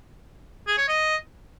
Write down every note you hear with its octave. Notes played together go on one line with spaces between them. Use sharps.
G#4
C#5
D#5